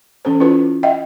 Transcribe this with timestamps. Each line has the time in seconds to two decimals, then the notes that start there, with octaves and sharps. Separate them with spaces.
0.25 E3 C#4 A4 C5
0.40 C#4 E4 F4 B4 C5
0.83 D#5 E5 F#5 G5